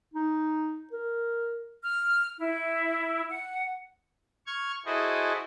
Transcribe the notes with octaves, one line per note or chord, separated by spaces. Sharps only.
D#4
A#4
F6
E4
F#5
C#6 F6 G#6
E4 F#4 G#4 A4 C5 D#5